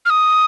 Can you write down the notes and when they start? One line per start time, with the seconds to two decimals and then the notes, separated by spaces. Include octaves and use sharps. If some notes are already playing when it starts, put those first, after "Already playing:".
0.05 F6
0.10 D#6